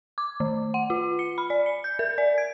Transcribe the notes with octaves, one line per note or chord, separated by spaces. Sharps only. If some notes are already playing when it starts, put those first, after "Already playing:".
D6
D#3
F#5
F4
C#7
B5
D5
C#7
G6
A#4
D5
G#6